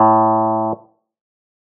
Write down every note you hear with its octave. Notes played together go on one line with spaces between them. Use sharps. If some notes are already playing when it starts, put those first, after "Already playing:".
Already playing: A2